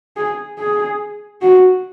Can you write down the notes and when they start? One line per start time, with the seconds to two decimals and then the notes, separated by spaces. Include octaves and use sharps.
0.17 G#4
0.59 G#4
1.42 F#4